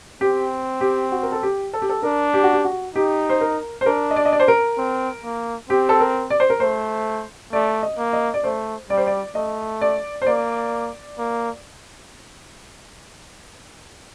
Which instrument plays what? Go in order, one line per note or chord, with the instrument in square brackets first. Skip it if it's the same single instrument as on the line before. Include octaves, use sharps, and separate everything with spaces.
[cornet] C4 [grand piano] G4
[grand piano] G4
F#4
A#4
A4
G4
A4
G4
A4
[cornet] D4 [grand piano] A#4
[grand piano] G4
F#4
G4
F#4
[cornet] D#4 [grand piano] G4
[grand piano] C5
A#4
C5
[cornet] D4 [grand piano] A#4
[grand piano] D#5
D5
D#5
D5
C5
A#4
[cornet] C4
A#3
[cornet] C4 [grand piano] G4
[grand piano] A4
A#4
D5
C5
A#4
[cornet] A3 [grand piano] C5
[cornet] A3 [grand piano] D5
[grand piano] D#5
[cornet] A#3
[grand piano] D#5
D5
[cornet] A3 [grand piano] C5
[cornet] G3 [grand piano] D5
[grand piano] C5
D5
[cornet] A3 [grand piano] D#5
[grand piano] D5
C5
[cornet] A#3 [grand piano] D5
[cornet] A#3